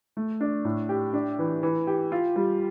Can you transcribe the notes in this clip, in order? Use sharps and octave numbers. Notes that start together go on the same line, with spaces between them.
A3
D4
A2
G4
D4
E3
E3
G4
F4
G3